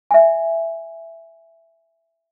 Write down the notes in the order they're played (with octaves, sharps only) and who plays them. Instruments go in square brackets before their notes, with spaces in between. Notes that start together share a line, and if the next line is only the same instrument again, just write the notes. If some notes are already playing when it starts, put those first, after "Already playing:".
[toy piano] E5 G#5